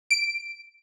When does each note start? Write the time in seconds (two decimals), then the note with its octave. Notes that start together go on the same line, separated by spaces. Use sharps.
0.11 D7